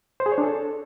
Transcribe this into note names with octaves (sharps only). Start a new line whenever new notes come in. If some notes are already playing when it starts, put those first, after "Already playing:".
C5
G#4
C#5
D4
A4